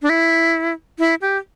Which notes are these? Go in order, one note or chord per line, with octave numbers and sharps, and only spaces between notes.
D4
E4
E4
G4